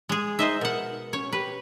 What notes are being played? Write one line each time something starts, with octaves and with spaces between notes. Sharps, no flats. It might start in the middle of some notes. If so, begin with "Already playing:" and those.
G#3 G#4
D#4 C5 D#5 E5
B2 A#4 F#5
C#4 C#5
G4 B4